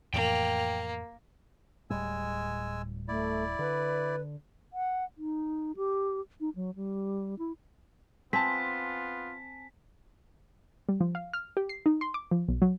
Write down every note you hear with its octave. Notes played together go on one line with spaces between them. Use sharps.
F2 A2 E3 A#3 G5
D1 A2 G3 G#3 G#5 E6
A3 E4 D5
D3 B4
F#5
D#4
G4
D#4
F#3
G3
E4
B3 C4 F4 G#5 A5 B6
G3
F3
F5
F6
G4
C7
D#4
C6
D6
F3
B1
F#3